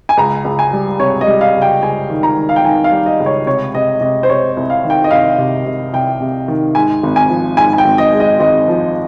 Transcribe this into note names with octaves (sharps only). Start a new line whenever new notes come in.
G#5
C#2 A#5
C#2
G#5
G3
C3 C#5
D#5
G3
F5
C#2
G5
C#2 G#5
D#3
A#5
D#3
F5
G5
D#3 G#5
F5
G3
D#5
C#2
C#5
C3 C#5
C3 D#5
C3 D#5
C5
C3 C#5
C2
F5
D#3
G5
D#5
C2 F5
C3
C3
C2 G5
C3
D#3
G#2 G#5
G#1
G#5
F3
G#2 G#5
G#5
G5
G#1
D#5
G#3
D#5
G#1 D#5
F3